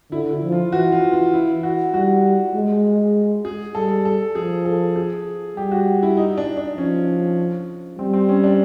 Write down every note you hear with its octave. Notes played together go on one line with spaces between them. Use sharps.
D3 E4
E4
F3
F4
E3 F#4
F4
F4
E4
F#4
G3 F#4
G#3
G#4
G3 A4
A4
F3 G#4
A4
G#4
G3 G4
F#4
E4
D#4
D4
D4
F3 C#4
G3 C4
C4
C#4
D4